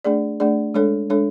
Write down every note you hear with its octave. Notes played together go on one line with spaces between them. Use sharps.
A3 D4 G#4 D5
A3 D4 G#4 D5
G#3 D4 A4 C#5
G#3 D4 A4 C#5